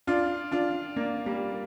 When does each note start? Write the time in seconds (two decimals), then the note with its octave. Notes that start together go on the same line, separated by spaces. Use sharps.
0.07 D4 F4
0.52 D4 F4
0.96 A#3 D4
1.26 G3 A#3